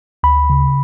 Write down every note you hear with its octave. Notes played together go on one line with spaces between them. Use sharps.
D2 B5
C#3